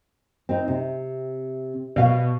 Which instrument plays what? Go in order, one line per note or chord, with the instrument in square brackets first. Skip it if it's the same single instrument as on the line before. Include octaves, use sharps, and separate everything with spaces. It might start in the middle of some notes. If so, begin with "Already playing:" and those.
[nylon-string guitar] C4 D#4
C3
[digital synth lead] B2 [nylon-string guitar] D5 F5